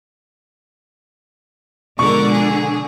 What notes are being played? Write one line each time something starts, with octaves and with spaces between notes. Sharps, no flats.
B2 D3 F3 G#3 A#4 D5 C#6
G#4